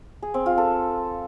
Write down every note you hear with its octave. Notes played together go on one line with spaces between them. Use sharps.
G#4
C4
F4
A4